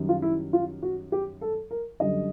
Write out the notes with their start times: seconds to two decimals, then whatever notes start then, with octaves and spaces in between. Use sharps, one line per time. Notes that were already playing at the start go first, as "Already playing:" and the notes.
Already playing: F#2 D#3 G3
0.09 F4
0.22 E4
0.53 F4
0.83 F#4
1.12 G4
1.41 A4
1.71 A#4
2.00 F#2 D3 G3 D#5